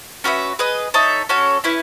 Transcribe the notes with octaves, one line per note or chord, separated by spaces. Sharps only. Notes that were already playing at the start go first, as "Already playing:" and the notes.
C#4 F#4 B4 E5
G#4 B4 D#5
D#4 A4 C#5 E5
C#4 F#4 A4 C#5
C#4 E4 B4